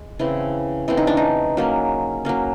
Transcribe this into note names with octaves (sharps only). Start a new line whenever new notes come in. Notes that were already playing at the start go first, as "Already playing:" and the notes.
Already playing: G#3
C#3 E3 A3 C4 E4
C#3 E3 A3 C4 E4
D#4
D4
D#4
F#3 A#3 C#4
F#3 A#3 C#4